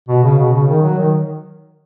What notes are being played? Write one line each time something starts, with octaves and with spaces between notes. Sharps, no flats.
B2
C#3
B2
C#3
D#3
F#3
D#3